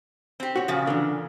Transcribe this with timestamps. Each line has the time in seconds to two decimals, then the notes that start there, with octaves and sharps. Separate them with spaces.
0.40 C4 G4
0.56 F#4 C#5
0.68 A#2 C#3 F3
0.87 D3 E3